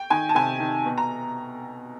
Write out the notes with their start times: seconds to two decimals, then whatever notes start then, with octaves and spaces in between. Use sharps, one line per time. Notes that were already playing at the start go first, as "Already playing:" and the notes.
Already playing: G5
0.10 D#3 G#5
0.29 A5
0.35 C3 G#5
0.60 D#3
0.85 B2
0.97 A#5